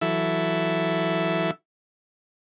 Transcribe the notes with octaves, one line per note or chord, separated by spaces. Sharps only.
E3 F#3 E4 A4 E5